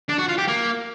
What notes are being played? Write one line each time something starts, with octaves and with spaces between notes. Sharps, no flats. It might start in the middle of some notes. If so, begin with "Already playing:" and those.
D4
F#4
F4
G4
A#3